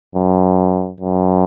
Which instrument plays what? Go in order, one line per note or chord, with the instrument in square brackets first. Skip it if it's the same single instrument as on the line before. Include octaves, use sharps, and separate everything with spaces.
[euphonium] F#2
F#2